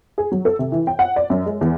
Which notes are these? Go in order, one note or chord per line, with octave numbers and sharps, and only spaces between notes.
G#4
F#3
A4
C3
E3
G5
F#5
D5
F#2
G#3
E2